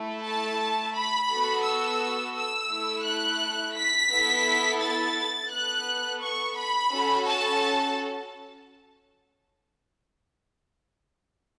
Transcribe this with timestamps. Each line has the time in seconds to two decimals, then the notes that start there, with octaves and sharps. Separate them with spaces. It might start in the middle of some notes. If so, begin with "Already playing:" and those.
Already playing: A3 E4 A4
0.24 A5
0.94 B5
1.29 B3 F#4 A4
1.64 E6
2.36 E6
2.70 A3 E4 A4
3.05 F#6
3.75 B6
4.11 B3 E4 A4
4.81 A6
5.51 B3 A4 F#6
6.22 C#6
6.56 B5
6.91 C#4 F#4 A4
7.27 A5